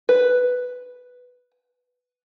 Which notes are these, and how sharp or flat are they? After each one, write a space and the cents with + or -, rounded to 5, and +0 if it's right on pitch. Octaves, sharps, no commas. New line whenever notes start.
B4 +0